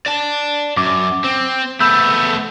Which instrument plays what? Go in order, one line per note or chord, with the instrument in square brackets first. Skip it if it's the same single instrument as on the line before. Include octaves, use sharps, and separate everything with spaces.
[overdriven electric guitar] D5 A5
[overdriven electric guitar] F#2 [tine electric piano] D6
[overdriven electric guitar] C4
[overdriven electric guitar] A3 B3 [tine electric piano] B5 E6 G6